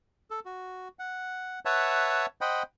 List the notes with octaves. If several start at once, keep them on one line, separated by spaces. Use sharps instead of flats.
A4
F#4
F#5
B4 C#5 E5 F#5 A5
C5 D#5 F#5 G5 B5